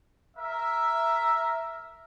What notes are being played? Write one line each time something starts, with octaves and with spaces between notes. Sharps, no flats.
A#4 E5